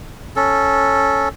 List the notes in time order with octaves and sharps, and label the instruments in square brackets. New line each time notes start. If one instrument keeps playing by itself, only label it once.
[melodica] C#4 A4